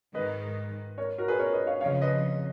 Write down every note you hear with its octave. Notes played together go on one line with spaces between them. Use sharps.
G#2 D#3 G#3 B4 D#5
A#4 C#5
F#4 A#4
G#4 B4
A#4 C#5
B4 D#5
C#5 F5
F2 C#3 F3 C#5 F5
B4 D#5